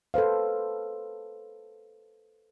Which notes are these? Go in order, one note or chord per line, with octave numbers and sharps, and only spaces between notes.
A4 B4 C5 F5